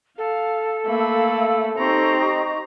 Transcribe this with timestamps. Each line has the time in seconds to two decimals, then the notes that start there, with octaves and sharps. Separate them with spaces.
0.18 A4 F5
0.87 A3 A#3 F5 B5 E6
1.78 C4 D#4 G4 A#5 C#6